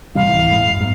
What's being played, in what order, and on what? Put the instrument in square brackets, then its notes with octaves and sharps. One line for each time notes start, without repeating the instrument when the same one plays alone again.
[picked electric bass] A1 C3 G3 [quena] F5
[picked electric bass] D1 E3
G1 A2 G#3
F#2
G#2 B3